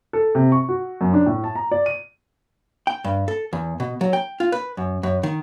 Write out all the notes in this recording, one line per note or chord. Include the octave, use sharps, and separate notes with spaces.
A4
C3
C#6
F#4
F#2
D4
A2
A5
A#5
D5
D#7
G5
G2
A4
E2
B2
F#3
G5
F4
B4
F#2
F#2
D#3